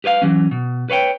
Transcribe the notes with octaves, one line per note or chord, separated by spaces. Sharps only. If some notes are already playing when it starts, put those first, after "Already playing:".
G4 B4 C#5 F5
E3 F#3 C#4
B2
B4 C#5 F5 G5